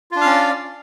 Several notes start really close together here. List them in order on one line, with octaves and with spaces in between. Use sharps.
F4 D4 F5 C#4 D5